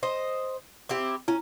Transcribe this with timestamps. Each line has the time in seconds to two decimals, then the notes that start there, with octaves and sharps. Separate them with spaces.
0.03 C5 D#5
0.89 C4 E4 G4
1.28 C#4 E4